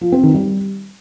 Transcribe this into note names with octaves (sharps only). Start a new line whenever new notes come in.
F3
C4
D#3
G3